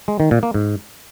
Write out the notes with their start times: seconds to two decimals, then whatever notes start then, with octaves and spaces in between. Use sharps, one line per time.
0.08 G#3
0.20 D#3
0.31 A#2
0.43 A#3
0.54 G#2